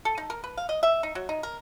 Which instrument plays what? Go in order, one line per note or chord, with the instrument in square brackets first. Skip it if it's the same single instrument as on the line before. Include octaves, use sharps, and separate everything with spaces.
[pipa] A4
D#4
A#4
B4
F5
D#5
E5
D#4
F#3
D#4
A#4